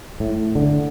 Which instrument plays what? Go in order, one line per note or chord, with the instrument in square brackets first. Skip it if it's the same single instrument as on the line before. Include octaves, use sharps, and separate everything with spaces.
[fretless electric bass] A2
D3